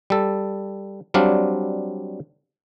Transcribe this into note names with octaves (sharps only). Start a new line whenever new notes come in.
G3 A4
F#3 G3 C4 D4 F5